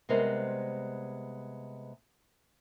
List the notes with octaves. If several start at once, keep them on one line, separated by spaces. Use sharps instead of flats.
C3 G3 G#3 B3 A#4 C5